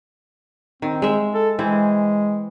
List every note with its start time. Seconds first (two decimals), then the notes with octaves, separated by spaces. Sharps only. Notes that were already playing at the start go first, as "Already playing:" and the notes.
0.82 D#3 C4
1.02 G#3 E5
1.34 A4
1.59 E3 G#3 C4